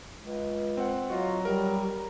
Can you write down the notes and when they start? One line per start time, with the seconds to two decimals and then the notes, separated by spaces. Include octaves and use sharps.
0.22 C#2
0.77 C4 F#5
1.10 F#3 F4 F#4 D#5
1.45 G3 A#4